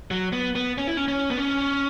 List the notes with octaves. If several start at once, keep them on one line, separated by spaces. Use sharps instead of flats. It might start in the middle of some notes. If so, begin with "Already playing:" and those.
F#3
B3
B3
C#4
E4
C#4
C#4
B3
C#4